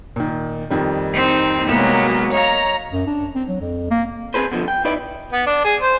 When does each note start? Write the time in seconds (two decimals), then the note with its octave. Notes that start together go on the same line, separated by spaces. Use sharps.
0.16 A#2 D#3
0.70 F2 D#3 G3
1.14 C4 D#4
1.69 C2 F#3 G#3 A#3 B3 E7
2.33 C#5 D#5 F5 A#5
2.93 F#2
3.07 D4
3.35 C4
3.48 F#3
3.61 F2
3.91 A#3
4.34 C4 G#4 B4 C5
4.52 B2 D3 E3 F3
4.68 G5
4.85 D#4 E4 B4 D5
5.32 B3
5.46 D4
5.64 G#4
5.81 C5